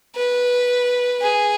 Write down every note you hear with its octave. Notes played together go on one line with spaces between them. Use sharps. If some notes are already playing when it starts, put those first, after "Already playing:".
B4
G#4